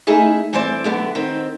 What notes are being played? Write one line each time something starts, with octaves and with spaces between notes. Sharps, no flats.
A3 C#4 D#4 E4 G#4 E5
G2 E3 A3 C4 C5 D5
D2 B2 D3 F#3 B3 G4
D#3 C4